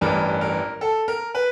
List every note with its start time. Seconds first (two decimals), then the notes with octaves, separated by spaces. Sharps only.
0.01 A1 G2 E3 A#4
0.41 A#4
0.81 A4
1.08 A#4
1.35 B4